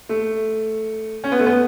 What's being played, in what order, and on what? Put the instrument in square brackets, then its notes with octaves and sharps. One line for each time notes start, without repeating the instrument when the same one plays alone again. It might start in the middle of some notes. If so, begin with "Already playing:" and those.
[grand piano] A3
C#4
B3
A3
B3